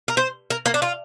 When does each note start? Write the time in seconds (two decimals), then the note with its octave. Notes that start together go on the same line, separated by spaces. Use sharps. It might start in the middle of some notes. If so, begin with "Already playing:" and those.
0.08 A#4
0.17 C5
0.50 A#4
0.66 A#3
0.74 D4
0.82 F4